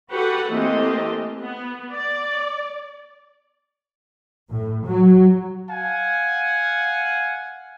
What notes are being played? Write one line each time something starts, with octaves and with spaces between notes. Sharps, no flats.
F#4 G4 A4 B4 F#5
E3 A3 A#3 C4 G4 D#5
B3
D5
A2
F#3
F5 F#5 G#5